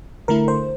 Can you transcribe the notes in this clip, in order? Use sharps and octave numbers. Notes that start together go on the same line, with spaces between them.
D3 A3 E4 A#4
C5